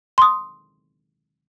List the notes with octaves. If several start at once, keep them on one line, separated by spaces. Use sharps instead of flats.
C6 D#6